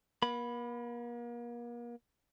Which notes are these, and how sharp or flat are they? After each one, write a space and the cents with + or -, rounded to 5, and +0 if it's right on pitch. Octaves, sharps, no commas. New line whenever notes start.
A#3 +40 B5 +0